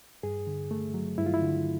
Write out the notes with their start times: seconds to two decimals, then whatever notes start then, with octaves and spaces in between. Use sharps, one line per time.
0.23 G2 G#4
0.47 D3
0.71 A3
0.94 F#3
1.18 G2 E4
1.26 F4
1.34 E4
1.42 D3